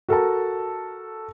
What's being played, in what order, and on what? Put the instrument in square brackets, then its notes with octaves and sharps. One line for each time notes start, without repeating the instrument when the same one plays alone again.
[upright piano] F#4 A4 A#4 A5